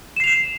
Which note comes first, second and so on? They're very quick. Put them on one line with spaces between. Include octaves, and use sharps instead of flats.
E7 C7 F7